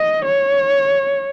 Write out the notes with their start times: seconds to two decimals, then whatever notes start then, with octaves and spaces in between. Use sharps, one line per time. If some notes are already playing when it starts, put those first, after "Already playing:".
Already playing: D#5
0.25 C#5